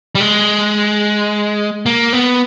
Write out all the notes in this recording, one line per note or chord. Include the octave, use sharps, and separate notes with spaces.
G3
G#3
A#3
B3